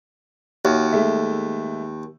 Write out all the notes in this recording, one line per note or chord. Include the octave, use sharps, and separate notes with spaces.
D#2 F#4 C#5 E5
G#3 A3 E5